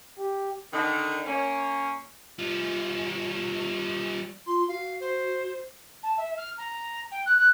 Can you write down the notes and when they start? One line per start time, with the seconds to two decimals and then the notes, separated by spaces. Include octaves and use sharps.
0.18 G4
0.73 D3 D#3
1.26 A#3 C#4
2.39 G3 F4
4.47 F4 C6
4.68 F#4 F5
5.00 C5
6.03 A5
6.17 E5
6.37 F6
6.57 A#5
7.11 G5
7.26 F#6
7.38 F#6